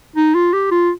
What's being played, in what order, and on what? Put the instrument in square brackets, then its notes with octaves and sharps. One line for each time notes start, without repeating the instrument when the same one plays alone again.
[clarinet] D#4
F4
G4
F4